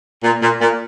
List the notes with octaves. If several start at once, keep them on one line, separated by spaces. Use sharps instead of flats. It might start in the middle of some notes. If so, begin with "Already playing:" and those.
A#2
A#2
A#2